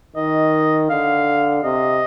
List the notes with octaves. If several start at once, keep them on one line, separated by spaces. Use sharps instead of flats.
D#3 D#5
D3 F5
C3 D#5